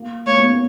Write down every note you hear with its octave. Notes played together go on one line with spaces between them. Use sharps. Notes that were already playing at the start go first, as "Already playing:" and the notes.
Already playing: A#3
A#3 C#5
B3
C#4